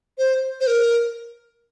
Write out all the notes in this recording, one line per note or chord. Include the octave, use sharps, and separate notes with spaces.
C5
C5
A#4